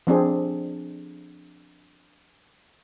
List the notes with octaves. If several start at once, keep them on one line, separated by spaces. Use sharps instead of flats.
F3 C4 D4 G#4